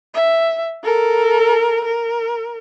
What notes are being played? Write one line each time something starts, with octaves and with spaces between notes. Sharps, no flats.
E5
A4 A#4
A#4